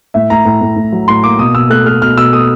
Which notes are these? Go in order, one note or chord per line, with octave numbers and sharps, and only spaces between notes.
A2 E5
A2 A#5
A2
A2
A2
F#3
A2 C6
A#3 D6
B2 D#6
B2 E6
A3 F#6
A3 F6
B2 F6
B2 E6
A3 D#6